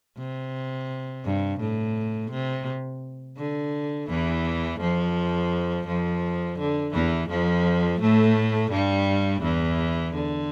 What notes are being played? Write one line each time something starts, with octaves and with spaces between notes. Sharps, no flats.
C3
G2
A2
C3
D3
E2 E3
F2 F3
F2 F3
D3
E2 E3
F2 F3
A2 A3
G2 G3
E2 E3
D3